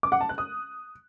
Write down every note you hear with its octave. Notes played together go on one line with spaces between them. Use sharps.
D6
F#5
A5
F#6
D#6